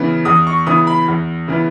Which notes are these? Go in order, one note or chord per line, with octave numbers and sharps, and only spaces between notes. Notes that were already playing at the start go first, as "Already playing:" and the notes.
Already playing: C#3 E3 B3
E2 D#6
C#6
C#3 E3 B3 D#6
B5
E2
C#3 E3 B3